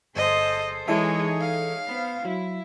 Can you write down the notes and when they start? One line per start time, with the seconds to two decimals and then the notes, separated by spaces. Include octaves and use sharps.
0.17 G1 G#4 A4 C5 D#5
0.88 E3 G#3 D#4 G#4 A4 C#5 E5
1.41 F5
1.87 B3 C5
2.25 F#3 E4